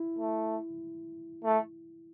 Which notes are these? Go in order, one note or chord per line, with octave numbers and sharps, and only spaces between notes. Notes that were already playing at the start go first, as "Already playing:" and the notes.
Already playing: E4
A3
A3